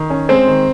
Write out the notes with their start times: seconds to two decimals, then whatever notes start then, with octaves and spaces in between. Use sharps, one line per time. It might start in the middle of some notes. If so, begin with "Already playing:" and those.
Already playing: D#3
0.10 C#4
0.29 G#3 C4 C5
0.47 D#3